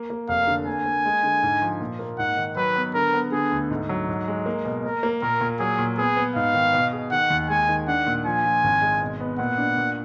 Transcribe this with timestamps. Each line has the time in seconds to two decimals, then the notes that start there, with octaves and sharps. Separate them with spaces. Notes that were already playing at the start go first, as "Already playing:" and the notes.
Already playing: A#3
0.10 A#3
0.28 F1 F5
0.47 D3
0.67 A#3 G#5
0.86 A#3
1.05 G#3
1.23 D3
1.43 G#2
1.62 F3
1.81 A#2
1.99 A#3
2.19 G#2 F#5
2.37 D#3
2.57 F#3 B4
2.76 B3
2.94 D3 A#4
3.14 B3
3.32 D3 G#4
3.51 D2
3.71 G#2
3.89 F#3
4.09 G#2
4.28 G#3
4.46 A#3
4.65 B2
4.84 A#3 A#4
5.03 A#3
5.22 A#2 A#4
5.41 A#2
5.60 F#3 G#4
5.79 A#2
5.98 B3 G#4
6.17 B3
6.35 G#2 F5
6.54 D#3
6.73 B2
6.93 G#4
7.11 D#3 F#5
7.30 D#2
7.49 G#3 G#5
7.69 D#3
7.87 D4 F#5
8.07 A#2
8.25 F3 G#5
8.45 F3
8.64 G#1
8.82 G#3
9.01 B2
9.20 B3
9.39 A#2 F#5
9.58 D4
9.77 A#2